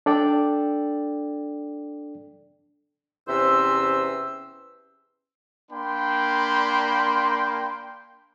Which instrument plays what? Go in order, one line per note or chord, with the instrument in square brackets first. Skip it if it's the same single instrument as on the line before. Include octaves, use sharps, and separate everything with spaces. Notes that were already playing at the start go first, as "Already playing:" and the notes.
[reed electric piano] D4 A4 D5 G5
[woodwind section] E2 C3 C#4 B4 C5 E6
[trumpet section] A#3 D4 G5 B5 C6